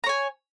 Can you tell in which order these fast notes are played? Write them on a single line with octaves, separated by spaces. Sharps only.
A#5 C#5 G#5